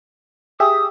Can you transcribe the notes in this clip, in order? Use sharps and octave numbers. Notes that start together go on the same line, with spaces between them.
G4 G#4 E5 D#6